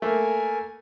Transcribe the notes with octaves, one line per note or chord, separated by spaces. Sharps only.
A3 A#3 A#4 G#5